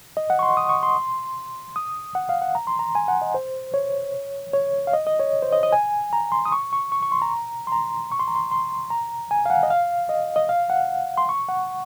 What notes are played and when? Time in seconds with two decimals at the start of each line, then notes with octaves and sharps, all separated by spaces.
0.17 D#5
0.30 F#5
0.39 C#6
0.43 C6
0.57 D#6
0.69 C#6
0.83 C6
1.76 D#6
2.15 F#5
2.29 F5
2.42 F#5
2.55 A#5
2.67 C6
2.79 A#5
2.95 G#5
3.08 F#5
3.22 D#5
3.34 C5
3.74 C#5
4.53 C#5
4.87 F5
4.93 D#5
5.07 D#5
5.20 C#5
5.42 C5
5.52 D#5
5.63 D#5
5.72 G#5
6.13 A#5
6.32 C6
6.45 D#6
6.52 C#6
6.73 C#6
6.92 C#6
7.02 C#6
7.12 C6
7.22 A#5
7.67 C6
7.72 A#5
8.12 C#6
8.20 C6
8.28 A#5
8.35 C6
8.51 C6
8.90 A#5
9.31 G#5
9.46 F5
9.50 F#5
9.63 D#5
9.70 F5
10.09 D#5
10.36 D#5
10.49 F5
10.70 F#5
11.17 C6
11.29 C#6
11.49 F#5